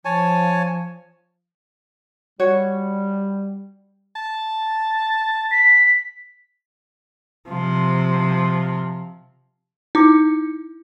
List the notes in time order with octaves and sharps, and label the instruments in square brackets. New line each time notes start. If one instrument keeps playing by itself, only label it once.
[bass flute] F3 [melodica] C#5 G#5 A5
[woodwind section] G3 [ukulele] F#4 C#5
[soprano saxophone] A5
[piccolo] B6
[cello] C3 F3
[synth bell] D#4 [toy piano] E4 D6